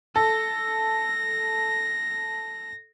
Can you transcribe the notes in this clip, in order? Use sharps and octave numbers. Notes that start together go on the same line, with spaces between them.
A4 A#6